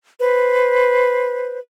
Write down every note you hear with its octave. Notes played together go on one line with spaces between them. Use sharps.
B4 C5